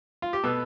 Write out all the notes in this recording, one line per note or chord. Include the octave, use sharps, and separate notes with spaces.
F4
G4
B2 B3 A4